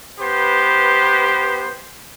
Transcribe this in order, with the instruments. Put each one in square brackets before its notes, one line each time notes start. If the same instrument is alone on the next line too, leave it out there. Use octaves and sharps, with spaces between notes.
[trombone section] B3 G4 B4 C5